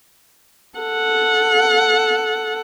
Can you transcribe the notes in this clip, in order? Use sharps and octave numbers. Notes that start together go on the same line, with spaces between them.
A4 F#5